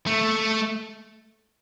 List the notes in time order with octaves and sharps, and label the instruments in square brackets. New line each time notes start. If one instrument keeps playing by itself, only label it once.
[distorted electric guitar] A3